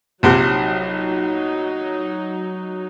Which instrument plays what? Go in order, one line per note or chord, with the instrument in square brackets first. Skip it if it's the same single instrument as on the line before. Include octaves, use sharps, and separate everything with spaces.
[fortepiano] A#1 C3 [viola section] F#3 D#4